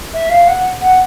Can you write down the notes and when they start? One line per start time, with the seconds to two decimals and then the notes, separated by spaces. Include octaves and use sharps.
0.14 E5
0.30 F5
0.47 F#5
0.81 F#5